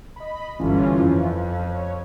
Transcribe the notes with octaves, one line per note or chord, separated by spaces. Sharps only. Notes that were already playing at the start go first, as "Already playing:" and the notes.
D#5 B5
G1 E3 C#4 F4
F2
C#5